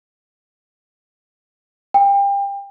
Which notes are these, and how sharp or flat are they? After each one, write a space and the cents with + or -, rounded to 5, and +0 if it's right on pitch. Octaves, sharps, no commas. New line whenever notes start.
G5 +30